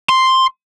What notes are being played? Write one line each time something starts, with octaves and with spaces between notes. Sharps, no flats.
C6